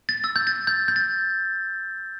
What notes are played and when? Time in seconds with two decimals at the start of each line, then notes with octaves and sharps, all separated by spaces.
0.09 A6
0.24 E6 A6
0.36 G6
0.47 A6
0.67 G6
0.88 G6
0.96 A6